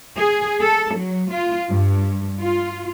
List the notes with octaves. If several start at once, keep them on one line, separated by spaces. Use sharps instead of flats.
G#4
A4
F#3
F4
G2
F4